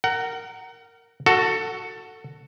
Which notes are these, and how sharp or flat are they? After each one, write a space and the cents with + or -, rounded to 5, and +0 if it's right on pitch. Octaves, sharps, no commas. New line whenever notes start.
A#4 -10 F#5 +30
F#4 +0 A4 +15